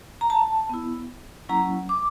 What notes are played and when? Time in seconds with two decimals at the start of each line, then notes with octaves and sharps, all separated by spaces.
0.21 A#5
0.30 A5
0.69 B3 E4
1.49 F#3 A#3 C#4 E4 A#5
1.89 D6